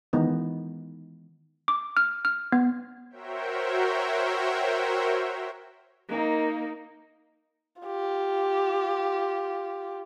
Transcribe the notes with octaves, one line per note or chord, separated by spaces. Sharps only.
D#3 E3 G#3 B3 D#4
D6
F6
F6
B3
F#4 A#4 C5 C#5 E5 G5
A#3 D#4
F4 G4